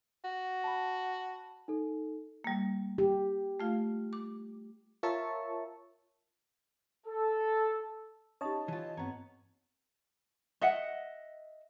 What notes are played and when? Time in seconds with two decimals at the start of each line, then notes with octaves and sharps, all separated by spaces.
0.24 F#4
0.64 A5 B5
1.68 D#4 A4
2.44 G3 A#3
2.98 G4
3.60 A3 F4 F5
4.13 D6
5.03 F4 A#4 C#5 E5 A5 C#6
7.05 A4
8.41 C#4 D#4 G4 C#5 D#5 A5
8.68 E3 F4
8.97 G2 B3 C4 C#5 A#5
10.61 D#5 E5 F#5